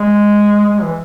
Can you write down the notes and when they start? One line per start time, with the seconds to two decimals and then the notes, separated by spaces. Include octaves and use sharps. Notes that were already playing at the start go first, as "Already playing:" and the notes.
Already playing: G#3
0.66 G#3
0.82 E3